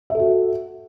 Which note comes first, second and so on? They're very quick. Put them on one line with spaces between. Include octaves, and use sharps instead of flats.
E5 A4 F#4